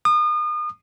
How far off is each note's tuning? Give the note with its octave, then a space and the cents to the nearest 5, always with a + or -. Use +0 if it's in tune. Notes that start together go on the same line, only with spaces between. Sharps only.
D#6 -35